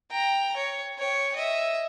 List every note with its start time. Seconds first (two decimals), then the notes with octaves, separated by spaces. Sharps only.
0.11 G5 A#5
0.56 C#5
0.98 C#5 G5
1.36 D#5 E5